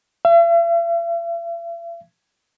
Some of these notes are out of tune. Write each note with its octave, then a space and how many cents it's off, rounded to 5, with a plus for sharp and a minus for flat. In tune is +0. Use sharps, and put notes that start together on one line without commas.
E5 +45